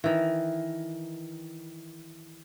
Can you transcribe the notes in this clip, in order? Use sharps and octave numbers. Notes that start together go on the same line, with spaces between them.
D#3 E3